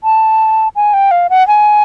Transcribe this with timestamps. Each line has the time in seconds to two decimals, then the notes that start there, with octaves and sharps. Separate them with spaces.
0.04 A5
0.76 G#5
0.94 G5
1.11 F5
1.30 F#5
1.48 G#5